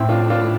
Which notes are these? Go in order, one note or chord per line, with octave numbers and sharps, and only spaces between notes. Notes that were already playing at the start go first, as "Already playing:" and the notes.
Already playing: A2 C4 E4
D4 F4
D4 F4